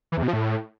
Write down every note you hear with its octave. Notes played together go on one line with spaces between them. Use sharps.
E3
E2
B2
F3
A2